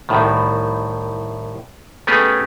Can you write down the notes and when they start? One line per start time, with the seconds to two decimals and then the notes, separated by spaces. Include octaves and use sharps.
0.09 C2 A2 D#3
2.07 A3 B3 C#4 G4 G#4